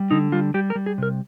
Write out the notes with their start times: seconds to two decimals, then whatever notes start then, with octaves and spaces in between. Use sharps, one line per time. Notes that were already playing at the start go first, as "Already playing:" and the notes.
Already playing: G3
0.11 D3 D#4
0.32 G3 F4
0.54 G3 G4
0.70 A#4
0.75 G3
0.86 G#4
0.98 C3 A#4